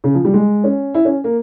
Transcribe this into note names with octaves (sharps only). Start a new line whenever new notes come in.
C#3
F3
G3
G#3
C#4
E4
C#4
A#3